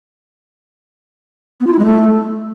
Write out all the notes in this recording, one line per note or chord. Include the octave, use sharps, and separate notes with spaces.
B3
F4
E4
G#3
A3